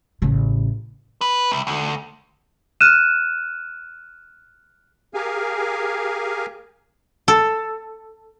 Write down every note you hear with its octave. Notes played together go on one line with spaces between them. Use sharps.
A1 C#3
B4
C2
D2
F6 F#6 D#7 E7
G4 G#4 A#4 F5 G#5
A4